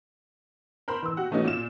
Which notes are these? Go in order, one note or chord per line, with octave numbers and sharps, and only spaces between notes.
A#4 C5 B5 C6
E3 E6
F#4 G4 F#5
E3 A3 B3 C#4 D#4 F#4
A#2 F4 E7